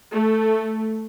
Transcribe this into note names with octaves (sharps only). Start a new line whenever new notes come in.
A3